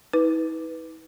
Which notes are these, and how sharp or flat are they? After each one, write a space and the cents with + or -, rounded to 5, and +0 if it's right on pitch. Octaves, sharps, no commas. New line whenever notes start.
E4 -45 B4 +0